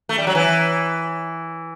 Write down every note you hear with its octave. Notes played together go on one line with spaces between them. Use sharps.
A3
G3
F#3
E3